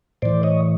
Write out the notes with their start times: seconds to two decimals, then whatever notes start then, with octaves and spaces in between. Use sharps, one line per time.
0.22 A2 E3 C5 D5
0.43 C#5 D#5